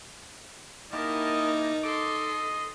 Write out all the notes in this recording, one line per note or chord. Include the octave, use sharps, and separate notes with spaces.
A#3 D#4 E4 G4 A#4 D#5 A5
A4 D#5 C6 D6